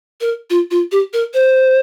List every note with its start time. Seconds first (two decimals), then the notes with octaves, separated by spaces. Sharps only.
0.21 A#4
0.50 F4
0.71 F4
0.92 G4
1.13 A#4
1.34 C5